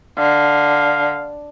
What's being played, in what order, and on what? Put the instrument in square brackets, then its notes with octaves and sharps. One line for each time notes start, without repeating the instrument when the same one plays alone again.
[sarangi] D3 [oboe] F5